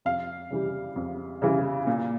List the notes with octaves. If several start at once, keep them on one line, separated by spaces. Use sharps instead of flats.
F2 F5
C#3 E3 G3
F2
C#3 E3 G3
A#2